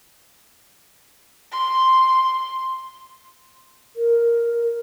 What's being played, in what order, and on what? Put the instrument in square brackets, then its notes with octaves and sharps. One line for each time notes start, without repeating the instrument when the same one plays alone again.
[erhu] C6
[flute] A#4